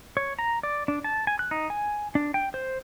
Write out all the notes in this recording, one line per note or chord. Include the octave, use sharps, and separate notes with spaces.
C#5
A#5
D5
D4
A5
G#5
F#6
D#4
G#5
D4
G5
C5